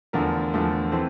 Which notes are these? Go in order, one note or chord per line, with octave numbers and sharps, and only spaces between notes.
E2 D3 F3 A3 A#4
E2 D3 F3 A3
E3 A3 C4 C5